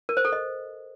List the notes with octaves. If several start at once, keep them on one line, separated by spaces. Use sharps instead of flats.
A#4
C5
A4
D#5